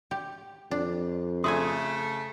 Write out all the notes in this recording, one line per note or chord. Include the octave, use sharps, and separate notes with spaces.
G4
F2 D4
C#3 A3 F#4 D#5 E5 G#5 C6 D#6